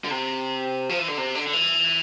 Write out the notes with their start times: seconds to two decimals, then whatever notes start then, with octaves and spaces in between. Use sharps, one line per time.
0.04 D3
0.11 C3
0.89 F3
0.99 E3
1.08 D3
1.18 C3
1.35 D3
1.47 D3
1.53 E3